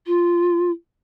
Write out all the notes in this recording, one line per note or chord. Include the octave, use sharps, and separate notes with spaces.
F4